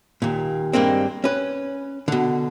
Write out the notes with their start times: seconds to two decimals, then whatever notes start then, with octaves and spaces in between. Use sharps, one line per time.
0.22 D#2 A#2
0.73 G2 G3 G#3 A#3 C4
1.24 C#4 B4
2.08 B2 D3